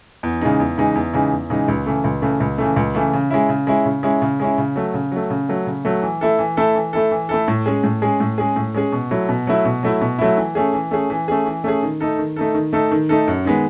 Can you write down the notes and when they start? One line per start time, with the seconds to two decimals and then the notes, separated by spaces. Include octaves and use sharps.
0.23 E2
0.41 C#3 E3 G#3 D#4
0.60 E2
0.77 C#3 E3 G#3 D#4
0.95 E2
1.14 C#3 E3 G#3 D#4
1.32 E2
1.50 C#3 E3 G#3 D#4
1.68 C#2
1.86 C#3 E3 A3
2.04 C#2
2.22 C#3 E3 A3
2.40 C#2
2.58 C#3 E3 A3
2.76 C#2
2.95 C#3 E3 A3
3.13 C#3
3.30 G#3 C#4 E4
3.49 C#3
3.67 G#3 C#4 E4
3.85 C#3
4.03 G#3 C#4 E4
4.22 C#3
4.40 G#3 C#4 E4
4.58 C#3
4.76 F#3 A3
4.94 C#3
5.11 F#3 A3
5.30 C#3
5.49 F#3 A3
5.66 C#3
5.85 F#3 A3
6.03 E3
6.21 A3 E4 A4
6.39 E3
6.57 A3 E4 A4
6.75 E3
6.93 A3 E4 A4
7.11 E3
7.29 A3 E4 A4
7.48 A2
7.66 G#3 C#4 G#4
7.83 A2
8.02 G#3 C#4 G#4
8.20 A2
8.38 G#3 C#4 G#4
8.56 A2
8.74 G#3 C#4 G#4
8.92 B2
9.11 F#3 A3 E4
9.29 B2
9.47 F#3 A3 E4
9.65 B2
9.83 F#3 A3 E4
10.01 B2
10.19 F#3 A3 E4
10.37 E3
10.55 A3 C#4 G#4
10.73 E3
10.91 A3 C#4 G#4
11.10 E3
11.28 A3 C#4 G#4
11.46 E3
11.64 A3 C#4 G#4
11.83 D#3
12.00 A3 D#4 A4
12.19 D#3
12.36 A3 D#4 A4
12.54 D#3
12.73 A3 D#4 A4
12.91 D#3
13.09 A3 D#4 A4
13.28 F#2
13.45 D#3 G#3 B3